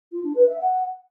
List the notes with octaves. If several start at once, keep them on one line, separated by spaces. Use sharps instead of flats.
F4
D4
B4
E5
F#5